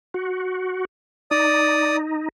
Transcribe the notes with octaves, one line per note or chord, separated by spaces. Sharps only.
F#4
D#4 D5 D#6